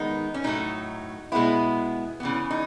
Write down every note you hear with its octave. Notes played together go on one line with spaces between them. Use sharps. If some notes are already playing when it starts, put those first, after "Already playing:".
Already playing: D#3 G#3 B3 D#4
C#4
A2 F#3 A3 D#4
B2 G#3 B3 E4
C#3 E3 B3
D#4